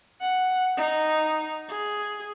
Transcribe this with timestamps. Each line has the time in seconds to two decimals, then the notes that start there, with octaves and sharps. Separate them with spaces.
0.21 F#5
0.77 D#4
1.69 G#4